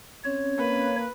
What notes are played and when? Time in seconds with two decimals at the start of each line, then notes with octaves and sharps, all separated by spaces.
0.25 C4 C#4 C#5
0.59 A#3 B4